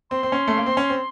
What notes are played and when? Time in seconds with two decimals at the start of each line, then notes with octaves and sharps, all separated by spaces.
0.11 C4 C6
0.23 C4
0.32 C#4
0.47 A3
0.57 A#3
0.66 C4
0.77 C#4
0.90 C4